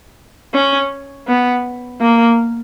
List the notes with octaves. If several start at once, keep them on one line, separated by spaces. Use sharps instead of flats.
C#4
B3
A#3